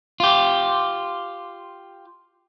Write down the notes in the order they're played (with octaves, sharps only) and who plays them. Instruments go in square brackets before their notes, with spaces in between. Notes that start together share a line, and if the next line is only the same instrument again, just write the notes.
[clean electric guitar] F4 G4